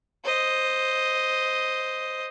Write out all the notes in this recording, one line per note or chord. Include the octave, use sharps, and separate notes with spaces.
C5 D#5